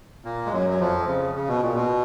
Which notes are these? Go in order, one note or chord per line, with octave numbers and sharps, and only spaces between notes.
A#2 A#3
G#3
F#2 F#3
F#3
F2 F3
C#3
C#3
B2
A#2
B2